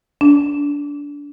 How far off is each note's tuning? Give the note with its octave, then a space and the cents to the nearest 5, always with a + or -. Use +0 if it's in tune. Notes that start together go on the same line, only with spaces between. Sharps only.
D4 -25